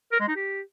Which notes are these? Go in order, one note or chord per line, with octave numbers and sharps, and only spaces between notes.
A#4
G#3
D#4
G4